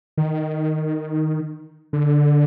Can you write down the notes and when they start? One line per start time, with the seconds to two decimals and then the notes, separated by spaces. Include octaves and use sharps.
0.17 D#3
1.93 D3